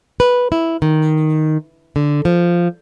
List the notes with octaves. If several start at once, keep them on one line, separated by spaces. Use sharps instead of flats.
B4
E4
D#3
D3
F3